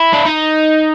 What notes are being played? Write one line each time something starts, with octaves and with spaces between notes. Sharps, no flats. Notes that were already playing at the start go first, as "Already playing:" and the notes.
Already playing: E4
D4
D#4